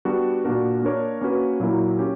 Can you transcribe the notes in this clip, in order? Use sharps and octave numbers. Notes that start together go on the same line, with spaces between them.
G3 B3 D4 F#4
A#2 A#3 D4 F#4 A#4
A#3 D4 A#4 C#5
A#3 C#4 F#4 B4
A#2 F#3 A#3 E4 A#4
C#4 G4